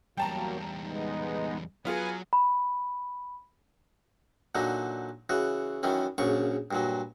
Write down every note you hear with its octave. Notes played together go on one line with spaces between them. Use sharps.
E2 F#3 G3 A#3 G5 A5 A#5
G#3 B3 D#4
F#3 B3 F4 G#4 B4 G#5
B5
A#2 D3 F#3 D#4
C#3 E3 F#4
F#2 D#3 E3 C#4
A#1 F#2 C#3 C#6
G2 A#2 F#3